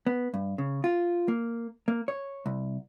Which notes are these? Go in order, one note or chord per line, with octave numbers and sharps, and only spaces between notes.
B3
G2
C#3
F4
A#3
A#3
C#5
C2